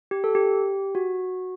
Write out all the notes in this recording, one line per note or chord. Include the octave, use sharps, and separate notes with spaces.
G4
A4
G4
F#4